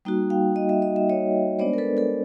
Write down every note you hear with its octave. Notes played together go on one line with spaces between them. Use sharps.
G3 A#3 D#4 F#4
F5 G5
D#5
E5
D#5
E5
C#5 D#5
G#3 B3 D4 C5 D5
A#4
A4 B4
A4 B4